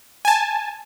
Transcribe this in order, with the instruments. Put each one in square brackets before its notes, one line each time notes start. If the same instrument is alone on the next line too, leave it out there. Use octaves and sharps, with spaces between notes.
[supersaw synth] G#5 A5